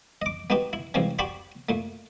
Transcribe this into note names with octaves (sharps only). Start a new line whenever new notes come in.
D#5 D6
B3 D#4 F#4 G4 B4
E4
G#2 C3 E3 F3 G3
F#4 G4 D5 G5 B5 C#6
A#2 A3